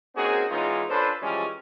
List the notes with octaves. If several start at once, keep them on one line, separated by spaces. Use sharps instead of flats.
A#3 C4 C#4 D#4 F#4 G#4
E3 G#3 B3 C#4 D#4 F4
C#4 D4 F4 A4 B4 C5
E3 F3 G3 G#3 C#4